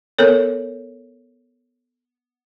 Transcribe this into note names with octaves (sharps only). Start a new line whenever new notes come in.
B3 A4 A#4 C#5